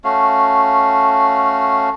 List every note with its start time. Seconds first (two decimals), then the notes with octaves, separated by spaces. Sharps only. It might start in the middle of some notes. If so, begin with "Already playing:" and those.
0.04 A3 C#4 F#4 F5